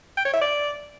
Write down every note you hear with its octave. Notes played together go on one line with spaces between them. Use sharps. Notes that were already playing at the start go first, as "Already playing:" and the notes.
G5
C#5
E5
D5